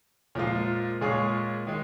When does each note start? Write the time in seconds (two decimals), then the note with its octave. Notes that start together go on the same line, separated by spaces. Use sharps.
0.35 A#2 F3 G#3 F4
1.01 A#2 G#3 F4 G#4 C#5
1.67 D#3 G#3